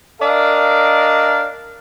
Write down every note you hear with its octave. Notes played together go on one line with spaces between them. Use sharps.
D4 A#4 D5 D#5 F5